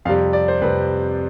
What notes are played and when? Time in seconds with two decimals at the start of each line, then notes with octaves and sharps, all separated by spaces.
0.05 F2 C3 G3 F5
0.33 D5
0.48 C5
0.62 F2 C3 G3 B4